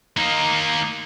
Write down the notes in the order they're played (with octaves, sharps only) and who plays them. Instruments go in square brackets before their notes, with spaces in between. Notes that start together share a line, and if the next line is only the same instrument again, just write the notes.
[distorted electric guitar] A#3 D#4